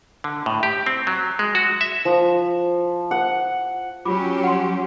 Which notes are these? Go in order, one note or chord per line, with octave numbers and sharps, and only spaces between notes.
D3
A2
G4
C4
F#3
G#3
F#4
E5
F3
F#5
F#3 C#4 F4 G4 B5 D6
F#5 C6